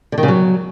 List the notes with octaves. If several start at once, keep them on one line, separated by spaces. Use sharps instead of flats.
D3
D#3
C#3
F#3